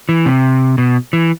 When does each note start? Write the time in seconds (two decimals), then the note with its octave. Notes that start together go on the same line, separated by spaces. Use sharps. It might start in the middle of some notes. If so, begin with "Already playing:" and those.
0.09 E3
0.26 C3
0.78 B2
1.13 E3